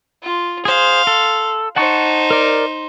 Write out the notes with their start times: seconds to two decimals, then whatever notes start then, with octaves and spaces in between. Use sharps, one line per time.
0.23 F4
0.65 G#4 C5 F5 C6
1.07 A4
1.76 D#4 C5 F#5 A5 C#6
2.31 A#4 D5